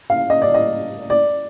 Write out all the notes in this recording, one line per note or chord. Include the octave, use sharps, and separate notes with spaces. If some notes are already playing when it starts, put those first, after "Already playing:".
F5
D#5
D5
D#5
D5